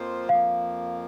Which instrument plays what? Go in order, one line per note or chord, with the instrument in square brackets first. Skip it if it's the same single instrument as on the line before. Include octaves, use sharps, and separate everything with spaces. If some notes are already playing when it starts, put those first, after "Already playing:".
Already playing: [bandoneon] F2 F3 A#3 F4 C5
[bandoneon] F2 F3 A#3 [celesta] F5